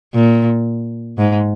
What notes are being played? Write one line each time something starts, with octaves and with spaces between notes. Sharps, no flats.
A#2
G#2